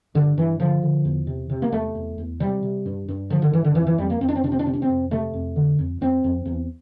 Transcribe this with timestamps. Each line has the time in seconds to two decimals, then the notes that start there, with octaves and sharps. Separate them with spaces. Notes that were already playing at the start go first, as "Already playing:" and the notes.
0.15 G2 D3
0.37 G2 E3
0.60 D3 F3
0.83 D3
1.05 E2
1.27 C3
1.50 C3
1.62 A#3
1.72 E2 A3
1.95 E2
2.18 E2
2.40 C3 G3
2.63 C3
2.86 G2
3.08 G2
3.30 D3 F3
3.42 D3
3.52 G2 E3
3.64 D3
3.75 F2 E3
3.87 E3
3.98 F2 G3
4.10 A#3
4.21 F2 C4
4.28 D4
4.35 C4
4.44 C3 D4
4.52 C4
4.59 D4
4.66 C3 C4
4.73 D4
4.82 C4
4.89 F2
5.11 C3 A3
5.34 F2
5.56 D3
5.79 F2
6.01 F2 C4
6.24 F2
6.46 E2